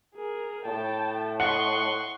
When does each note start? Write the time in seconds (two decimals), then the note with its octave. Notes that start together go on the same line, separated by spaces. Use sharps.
0.15 G#4 A#4
0.66 A2 G5 A5
1.40 D#5 F#5 C6 C#6 F#6